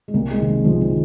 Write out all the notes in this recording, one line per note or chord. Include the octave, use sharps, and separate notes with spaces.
G#3
C2 A#3
G#3
C3 D#3
G3
C2 F3
F3
D#3